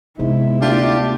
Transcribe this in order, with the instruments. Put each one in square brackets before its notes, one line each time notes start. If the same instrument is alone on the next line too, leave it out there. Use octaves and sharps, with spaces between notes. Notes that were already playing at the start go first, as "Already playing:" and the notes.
[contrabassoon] G#2 [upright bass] C3 B3 [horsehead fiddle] E4 E5
[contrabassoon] D2 [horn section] D4 F4 G4